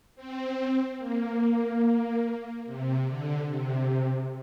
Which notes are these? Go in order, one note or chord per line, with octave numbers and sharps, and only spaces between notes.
C4
A#3
C3
D3
C3